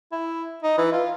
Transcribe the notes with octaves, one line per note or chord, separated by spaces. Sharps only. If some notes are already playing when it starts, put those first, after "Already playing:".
E4
D#4
E3
F4